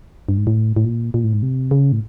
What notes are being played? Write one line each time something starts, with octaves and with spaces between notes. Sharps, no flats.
G2
G#2
A2
A2
A#2
A#2
A2
G#2
C3
C#3
A2